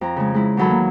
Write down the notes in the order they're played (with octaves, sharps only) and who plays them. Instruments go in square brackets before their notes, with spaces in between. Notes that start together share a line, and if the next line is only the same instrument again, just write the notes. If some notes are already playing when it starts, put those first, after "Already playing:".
[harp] F2 A#5
C#3 G#3
G#3 E4
E2 D#3 F#3 A4 B5
A#3